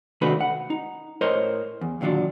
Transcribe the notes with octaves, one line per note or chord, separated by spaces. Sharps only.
C3 D#3 A3 D4 F#4 B4
F#5
D#4
A2 A#4 C5 C#5 D#5
E2
D#2 A#2 D3 F#3 D4